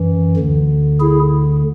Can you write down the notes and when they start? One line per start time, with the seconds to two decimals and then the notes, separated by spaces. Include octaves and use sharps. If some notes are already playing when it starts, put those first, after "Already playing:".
Already playing: F#2 E3
0.36 D2 D3
1.00 E4 G#4